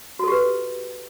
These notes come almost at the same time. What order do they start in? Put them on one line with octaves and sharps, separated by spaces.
F#4 A4 G4 B4